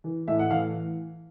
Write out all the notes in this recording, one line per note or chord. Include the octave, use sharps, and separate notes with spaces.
E3
A2 E5
F#5
E3 F5